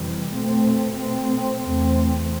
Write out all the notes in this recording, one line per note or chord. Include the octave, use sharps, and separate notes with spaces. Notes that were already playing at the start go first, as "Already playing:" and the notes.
Already playing: F2 C3 E3 G3
B2 A3 C4
B2 A3 C4
E2 C3 E3 A3 C4